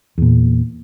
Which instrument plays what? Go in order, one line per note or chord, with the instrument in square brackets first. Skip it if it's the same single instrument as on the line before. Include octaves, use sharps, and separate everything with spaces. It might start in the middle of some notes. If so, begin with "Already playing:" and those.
[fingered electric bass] E2 A#2